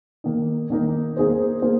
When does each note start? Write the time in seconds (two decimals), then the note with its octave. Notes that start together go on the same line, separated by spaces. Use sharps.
0.24 D#3 A#3 D#4
0.70 D#3 A#3 D#4
1.17 A#3 D#4 G#4 C5
1.62 A#3 D#4 G#4 C5